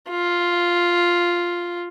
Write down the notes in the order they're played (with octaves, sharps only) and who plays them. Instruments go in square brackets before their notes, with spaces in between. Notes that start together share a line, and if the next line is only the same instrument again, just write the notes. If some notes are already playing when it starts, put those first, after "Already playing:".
[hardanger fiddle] F4